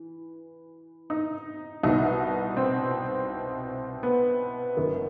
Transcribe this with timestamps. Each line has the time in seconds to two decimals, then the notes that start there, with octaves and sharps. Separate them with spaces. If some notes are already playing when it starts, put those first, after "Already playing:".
Already playing: E3
1.10 D#4
1.83 C2 B2 D#4
2.57 C4
4.03 B3
4.77 F#1 F#2 D#3